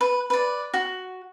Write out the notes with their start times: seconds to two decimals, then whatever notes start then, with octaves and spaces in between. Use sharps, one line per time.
0.01 B4
0.30 B4 D5
0.74 F#4